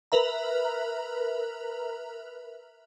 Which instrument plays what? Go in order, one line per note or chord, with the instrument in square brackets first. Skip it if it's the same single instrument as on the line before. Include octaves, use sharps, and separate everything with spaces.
[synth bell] A#4 B4 E5 A#5